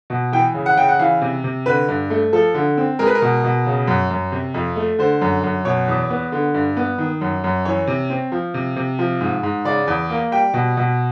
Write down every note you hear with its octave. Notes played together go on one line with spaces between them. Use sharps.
B2
E3 G5
C#3
F#5
C#3 G5
F#5
E3 F5
C3
C3
D3 B4
G2
A3
F3 A4
D3
C4
G#3 A#4
B4
A#4
B2
B2
C#3
F#2
F#2
C3
F2
A3
D3 C5
F#2
F#2
B2 C#5
E2
B3
D3
G2
B3
D#3
F#2
F#2
E3 C#5
C3
C4
F3
C3
C3
F3
G#2
G#2
C#3 D5
E2
A#3
G3 G5
B2
B2